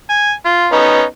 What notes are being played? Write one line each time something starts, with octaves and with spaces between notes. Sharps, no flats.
G#5
F4
B3 C#4 D#4